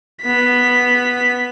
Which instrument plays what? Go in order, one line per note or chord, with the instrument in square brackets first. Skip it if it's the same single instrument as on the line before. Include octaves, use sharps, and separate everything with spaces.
[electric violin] B3 B6